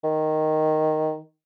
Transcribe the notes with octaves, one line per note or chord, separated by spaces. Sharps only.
D#3